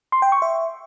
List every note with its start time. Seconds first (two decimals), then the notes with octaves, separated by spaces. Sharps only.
0.12 C6
0.22 G5
0.32 C#6
0.42 E5